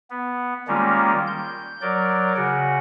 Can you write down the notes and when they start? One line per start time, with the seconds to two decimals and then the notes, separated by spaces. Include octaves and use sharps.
0.10 B3
0.68 D#3 G3 G#3 A#3 C#4 F4
1.28 G6
1.82 F#3 A#4 D5
2.36 C#3 F#4